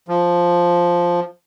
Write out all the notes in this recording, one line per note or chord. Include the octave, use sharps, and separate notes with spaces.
F3